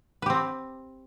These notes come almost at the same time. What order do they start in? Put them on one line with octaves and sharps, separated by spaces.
B4 G4 C4